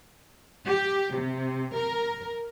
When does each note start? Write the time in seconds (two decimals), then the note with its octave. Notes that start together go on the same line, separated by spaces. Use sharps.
0.65 G4
1.14 C3
1.74 A#4